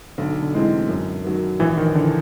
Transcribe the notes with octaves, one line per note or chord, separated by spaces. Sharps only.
B1 D3
D3
A2 E3 G#3 C4
F#2
D#3 F#3
A#1 E3
D#3
D3 E3